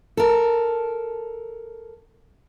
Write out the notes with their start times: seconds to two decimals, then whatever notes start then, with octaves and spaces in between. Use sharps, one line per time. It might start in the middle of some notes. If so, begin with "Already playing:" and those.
0.17 A4 A#4